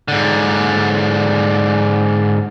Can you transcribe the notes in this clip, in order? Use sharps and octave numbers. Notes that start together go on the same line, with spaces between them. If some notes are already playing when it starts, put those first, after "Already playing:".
G#2 D3